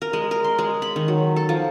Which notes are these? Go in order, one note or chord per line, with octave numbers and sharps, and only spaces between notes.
A#4
G#3
A#4
C6
G#3
B5
D#3
F#3
A4
F3